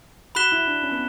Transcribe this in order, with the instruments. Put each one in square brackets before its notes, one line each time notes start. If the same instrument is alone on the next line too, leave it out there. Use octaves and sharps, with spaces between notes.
[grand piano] F#4 [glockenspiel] B5 F#6 B6 E7 G7
[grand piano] E4
D4
C#4
B3